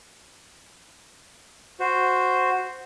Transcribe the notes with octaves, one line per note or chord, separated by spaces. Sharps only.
F#4 C5